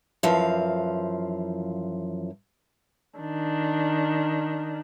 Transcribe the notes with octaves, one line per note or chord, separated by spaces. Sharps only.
F#2 E3 F3 F5
D#3 D4